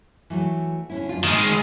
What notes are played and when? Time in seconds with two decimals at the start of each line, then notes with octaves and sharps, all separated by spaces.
0.30 E3 F#3 A3
0.90 D3 C#4 E4
1.09 F#2 D4 F4
1.24 D#3 G#3 A3 D#5 E5